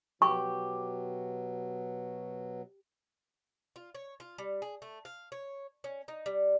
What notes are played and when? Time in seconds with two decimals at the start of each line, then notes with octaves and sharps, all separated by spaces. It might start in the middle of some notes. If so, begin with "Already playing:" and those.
0.22 B2 F#3 G4 C#6
3.76 F4
3.95 C#5
4.20 F4
4.38 G3
4.62 G#4
4.82 A3
5.05 F5
5.32 C#5
5.84 C#4
6.08 D#4
6.26 G3